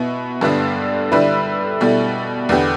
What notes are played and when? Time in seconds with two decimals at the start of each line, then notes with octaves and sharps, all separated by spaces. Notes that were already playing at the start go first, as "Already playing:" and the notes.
Already playing: B2 B3 E4
0.41 G2 D3 G3 B3 D4
1.12 D3 G3 E4 B4
1.81 B2 G3 E4 A4
2.49 E2 D3 B3 G4